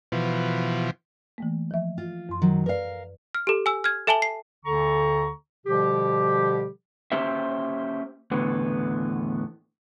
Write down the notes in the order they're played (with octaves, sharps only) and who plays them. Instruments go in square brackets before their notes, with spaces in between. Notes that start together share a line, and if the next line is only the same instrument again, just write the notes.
[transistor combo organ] B2 E3 F3
[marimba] E3 A3 A#3
F3 E5
[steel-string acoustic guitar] F4
[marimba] F#2 C6
[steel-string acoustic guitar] D#3 F#3
[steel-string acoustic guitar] A#4 F5 [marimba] B4 D5
[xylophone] F6
G4 A4
G#5 E6
F6 G#6
A4 E5 G#5 A5 F#7 G7
C7
[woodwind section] D2 D3 A#5 C#6
B2 D3 F3 G3 G4
[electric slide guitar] A#3 C#4 G4 C5 E5
E2 A2 D3 B3